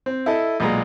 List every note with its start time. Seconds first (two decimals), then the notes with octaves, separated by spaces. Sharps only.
0.06 C4
0.26 E4 A4 D#5
0.60 B1 A#2 G#3 A#5